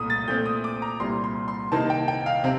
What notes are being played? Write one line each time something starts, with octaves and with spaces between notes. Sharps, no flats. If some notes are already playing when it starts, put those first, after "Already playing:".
Already playing: C2 A#2 A3 D#6
A6
A#2 A3 C4 G6
D#6
D6
A#5
C2 A#2 G3 C4 C6
C6
C6
C3 D#3 A#3 D#4 A5
G5
G5
F5
C3 C4